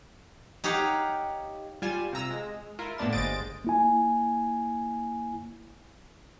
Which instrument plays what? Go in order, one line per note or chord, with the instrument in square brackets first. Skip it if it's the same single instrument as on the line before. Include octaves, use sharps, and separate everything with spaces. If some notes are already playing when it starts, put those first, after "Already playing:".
[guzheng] D#4 G4 C#5 F5 F#5
[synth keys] G3 F4 D5 G#5 E7
C3 F4 A#5 E6 A#6
G#3
E4 F4 A#4
A2 A#3 B3 D4 E7
G1 G#3 C5 D#5 A6 D7
[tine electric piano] A#3 E4 G#5